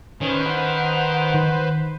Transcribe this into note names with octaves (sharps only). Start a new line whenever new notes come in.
D#3 C#4 B4 C5
F#5
D#3